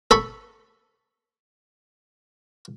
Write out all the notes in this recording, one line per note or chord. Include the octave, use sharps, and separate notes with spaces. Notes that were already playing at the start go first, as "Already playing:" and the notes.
A4 B5 C#6